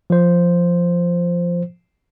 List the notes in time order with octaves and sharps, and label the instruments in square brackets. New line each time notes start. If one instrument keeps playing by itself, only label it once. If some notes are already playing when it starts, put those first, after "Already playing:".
[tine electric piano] F3 C5